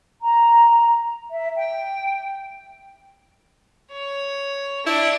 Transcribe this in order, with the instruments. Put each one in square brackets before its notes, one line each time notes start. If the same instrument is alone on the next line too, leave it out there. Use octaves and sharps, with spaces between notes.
[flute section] A#5
E5
G5
[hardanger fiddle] C#5
[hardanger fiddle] D4 D6 [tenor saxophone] E4